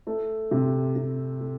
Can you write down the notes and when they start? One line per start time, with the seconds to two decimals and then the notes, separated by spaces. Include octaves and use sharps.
0.07 A3
0.51 C3
0.96 C3
1.40 A3